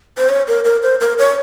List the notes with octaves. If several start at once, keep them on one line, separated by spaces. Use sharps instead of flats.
C5
C#5
A#4
A#4
C5
A#4
C#5